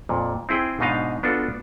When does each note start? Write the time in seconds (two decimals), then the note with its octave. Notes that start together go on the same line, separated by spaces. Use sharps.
0.09 F2 A#2
0.49 C4 E4 G#4 G5
0.80 G#2 B2 D4 D#4 D#5 F5
1.23 B3 D4 F4 F#4 A4